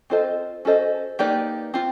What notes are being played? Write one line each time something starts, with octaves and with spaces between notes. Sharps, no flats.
C4 F4 A4 C5 D#5
C#4 F#4 A4 C5 D#5
A#3 D#4 G4 B4 D5
C4 F4